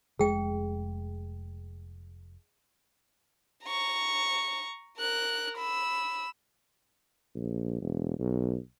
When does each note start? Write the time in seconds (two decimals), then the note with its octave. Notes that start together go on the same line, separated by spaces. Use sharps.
0.19 F1 G#3 G#4 G5
3.65 A#5 C#6
4.98 A#4 F#6
5.57 B5 E6
7.35 A#1
7.82 E1
8.19 B1